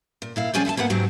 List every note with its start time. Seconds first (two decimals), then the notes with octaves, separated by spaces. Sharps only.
0.22 A#2
0.36 A#2 E4 F5
0.54 F3 C4 C#4 G#4 D5 G#5
0.65 D#2 E5 F#5 A5
0.77 G#2 A#3 B3 F#5
0.90 G#2 F#3 C4 G4